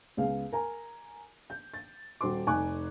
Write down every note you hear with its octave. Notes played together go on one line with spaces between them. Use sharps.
C#2 B3 G#4 F5
A#4 G#5 A#5
G6
A6
D#1 F#4 C5 C6 D6
F1 D#4 G#5 C#6 D6 F#6